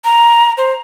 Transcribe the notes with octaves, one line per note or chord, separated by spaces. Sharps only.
A#5
C5